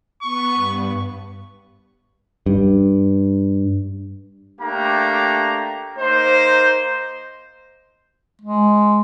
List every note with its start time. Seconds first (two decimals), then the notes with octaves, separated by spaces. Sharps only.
0.23 B3 B4 C#6
0.55 G2
2.46 G2
4.61 A3 A#3 D4 G4 A#5
5.98 A#3 D#4 C5
8.42 G#3